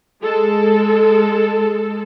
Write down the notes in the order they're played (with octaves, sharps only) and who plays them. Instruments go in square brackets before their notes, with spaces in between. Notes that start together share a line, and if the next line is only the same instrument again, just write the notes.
[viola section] G#3 A4